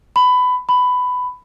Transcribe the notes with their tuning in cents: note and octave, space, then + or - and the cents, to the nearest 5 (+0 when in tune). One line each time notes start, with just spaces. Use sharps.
B5 +20
B5 +15